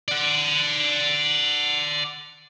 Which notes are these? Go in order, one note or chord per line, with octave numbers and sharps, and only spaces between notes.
D5 F#5